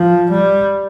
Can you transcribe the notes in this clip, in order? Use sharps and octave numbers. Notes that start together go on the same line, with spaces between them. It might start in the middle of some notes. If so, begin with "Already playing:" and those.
Already playing: F3
G3